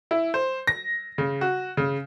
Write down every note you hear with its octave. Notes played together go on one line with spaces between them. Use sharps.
E4
C5
A#6
C#3
F#4
C#3